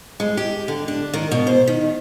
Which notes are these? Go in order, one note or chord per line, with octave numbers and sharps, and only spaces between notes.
G#3
G4
D3
D4
D#3
B2
C5
D#3